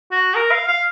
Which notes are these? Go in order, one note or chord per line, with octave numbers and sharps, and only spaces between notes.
F#4
A#4
F5
F5